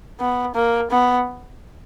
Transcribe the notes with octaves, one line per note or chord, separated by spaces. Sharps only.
B3
A#3
B3